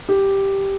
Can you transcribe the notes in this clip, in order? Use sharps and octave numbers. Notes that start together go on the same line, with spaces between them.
G4